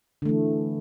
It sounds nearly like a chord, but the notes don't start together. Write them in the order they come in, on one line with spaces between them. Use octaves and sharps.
D3 A3 E3